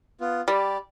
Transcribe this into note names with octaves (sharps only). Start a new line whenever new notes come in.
B3 F4
G3 G4 D5